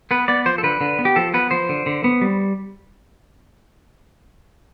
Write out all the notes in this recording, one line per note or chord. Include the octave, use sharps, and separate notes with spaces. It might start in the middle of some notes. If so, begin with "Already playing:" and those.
B3 B4
B3 D5
F3 C5
A4
D3 B4
D3
B3
G4
F3 A4
B3 B4
F3 C5
D3
D3
B3
G3